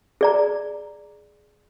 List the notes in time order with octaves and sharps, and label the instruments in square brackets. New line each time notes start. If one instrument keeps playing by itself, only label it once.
[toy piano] G#4 D5 A#5